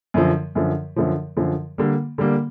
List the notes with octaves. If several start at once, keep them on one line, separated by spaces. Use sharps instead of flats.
F#2 D3 F3
F#2 D3 F3
F#2 D3 F3
F#2 D3 F3
D3 G3 A#3
D3 G3 A#3